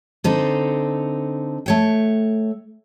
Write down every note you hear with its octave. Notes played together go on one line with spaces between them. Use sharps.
D3 C4 D#4 A4
A3 C#5 G5